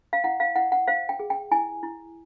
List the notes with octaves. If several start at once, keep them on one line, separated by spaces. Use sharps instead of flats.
F5
E4 F#5
F5
E4 F#5
F#5
C5 F5
G5
G#4
G5
E4 G#5
E4